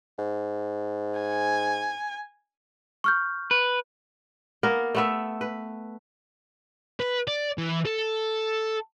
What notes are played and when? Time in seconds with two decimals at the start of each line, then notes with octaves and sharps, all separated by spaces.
0.19 G#2
1.20 G#5
3.04 C#6 F6 G6
3.51 B4
4.63 A#3 B3 A#4
4.95 A3 B3 E5
5.41 B4
7.00 B4
7.28 D5
7.58 E3
7.85 A4